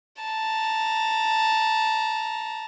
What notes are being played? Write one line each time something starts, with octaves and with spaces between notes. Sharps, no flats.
A5 A#5